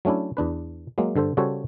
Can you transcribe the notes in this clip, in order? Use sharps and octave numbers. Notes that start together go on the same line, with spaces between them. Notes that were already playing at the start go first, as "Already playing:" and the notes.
F#3 A3 C#4 D4 E4
E2 D4 B4
F#3 G#3 A#3
G2 D3 A4 C5
C#3 G3 F#4 A4 C5 C#5